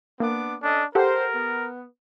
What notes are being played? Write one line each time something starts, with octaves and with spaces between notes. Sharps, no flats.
A#3 B3 D4 D6
C#4 D4 A4 D#5
G4 A4 A#4 C5 F#5
B3